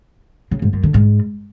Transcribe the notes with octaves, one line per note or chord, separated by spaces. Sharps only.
C#3
G#2
F#2
D3
G#2